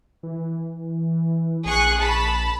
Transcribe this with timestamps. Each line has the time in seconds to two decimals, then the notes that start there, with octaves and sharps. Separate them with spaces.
0.23 E3
1.65 A#1 G#4 C#6 F#6
2.00 A5 B5